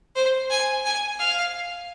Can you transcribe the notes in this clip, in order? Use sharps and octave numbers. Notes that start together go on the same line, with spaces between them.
C5
G#5
G#5
F5